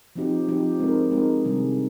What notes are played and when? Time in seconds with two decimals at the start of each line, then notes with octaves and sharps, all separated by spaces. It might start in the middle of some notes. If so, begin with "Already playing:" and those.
0.16 F3 C4 D#4 G4
0.47 F3 C4 D#4 G4
0.79 G#3 C4 D#4 A#4
1.11 G#3 C4 D#4 A#4
1.44 C3 D#3 G3 D4 G#4